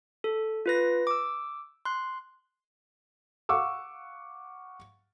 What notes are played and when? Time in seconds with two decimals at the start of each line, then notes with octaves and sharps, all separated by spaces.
0.24 A4
0.66 F4 B4 A#6
1.07 D6 E6
1.85 C6 F#6
3.49 F5 F#5 C#6 D6 E6